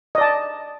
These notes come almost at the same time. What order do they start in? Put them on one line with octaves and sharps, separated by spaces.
D#5 D5 A5